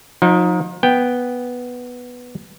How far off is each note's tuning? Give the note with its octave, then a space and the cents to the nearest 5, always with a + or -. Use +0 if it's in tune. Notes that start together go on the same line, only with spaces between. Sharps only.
F3 +40 D#4 +0
B3 +0 G5 +0